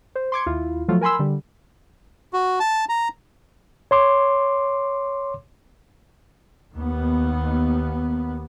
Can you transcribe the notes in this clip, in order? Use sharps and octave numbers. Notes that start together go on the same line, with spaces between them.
C5
C6 D6 G#6 C#7
D#2 E4 F4
F3 F#3 A3 F4 A4
A#4 G#5 B5 C6 E6
D3 G3
F#4
A5
A#5
C#5 C6 D6
D#2 B3